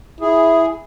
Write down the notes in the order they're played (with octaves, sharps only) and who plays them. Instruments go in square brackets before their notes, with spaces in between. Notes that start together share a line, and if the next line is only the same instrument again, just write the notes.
[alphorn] E4 [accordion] G#4